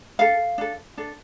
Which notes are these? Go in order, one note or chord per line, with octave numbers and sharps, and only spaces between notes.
D4 A4 F5
D4 A4
D4 A4